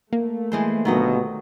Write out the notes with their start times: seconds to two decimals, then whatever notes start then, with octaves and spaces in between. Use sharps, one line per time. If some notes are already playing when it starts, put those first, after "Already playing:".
0.13 A3 A#3
0.52 E3 G#3 C5
0.85 G1 B2 D#3 F#3 D#5